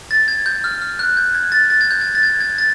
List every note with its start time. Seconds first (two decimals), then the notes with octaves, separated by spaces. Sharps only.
0.11 A6
0.28 G#6
0.46 G6
0.64 F6
0.82 F6
0.99 F#6
1.17 G6
1.35 G#6
1.52 A6
1.70 A6
1.81 G#6
1.91 G6
2.01 G#6
2.15 A6
2.23 G#6
2.41 G#6
2.58 A6